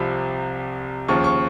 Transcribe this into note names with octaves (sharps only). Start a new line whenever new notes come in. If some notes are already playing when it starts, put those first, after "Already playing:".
Already playing: C2 C3 F3 B5
D#2 C#3 F3 C#6
C#6